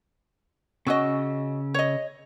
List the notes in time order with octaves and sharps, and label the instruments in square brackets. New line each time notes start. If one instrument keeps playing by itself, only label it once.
[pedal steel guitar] C#3 E6 [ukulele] C#4 F#4 D#5
[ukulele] C#5 D#5